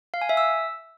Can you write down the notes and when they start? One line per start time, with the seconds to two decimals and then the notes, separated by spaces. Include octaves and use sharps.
0.14 F5
0.22 G#5
0.29 E5
0.37 E6